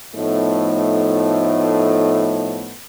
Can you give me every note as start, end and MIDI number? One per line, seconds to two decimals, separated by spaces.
0.15 2.73 45
0.15 2.73 53
0.15 2.73 57
0.15 2.73 59
0.15 2.73 63